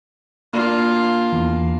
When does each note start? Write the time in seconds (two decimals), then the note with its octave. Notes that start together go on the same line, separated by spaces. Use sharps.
0.53 A#3 D4 F4
1.32 E2